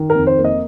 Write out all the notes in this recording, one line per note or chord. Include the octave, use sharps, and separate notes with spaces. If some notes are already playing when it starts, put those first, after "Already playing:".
Already playing: D#3
A#4
F2
C5
A#3
D#5